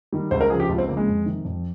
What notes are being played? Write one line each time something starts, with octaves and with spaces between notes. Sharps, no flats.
D#3 G3
C#2 C5
A#4
C#3 F3 G#4
G4
C#2 F4
C4
C#3 F3 A#3
G#3
F2
C3 D#3
F2